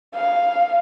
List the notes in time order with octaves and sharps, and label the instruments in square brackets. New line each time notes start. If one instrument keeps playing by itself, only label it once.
[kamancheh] F5